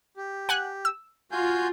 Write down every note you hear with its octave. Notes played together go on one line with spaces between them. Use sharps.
G4
F#5 G#5 F#6
E6
F4 F#4 G#5 G6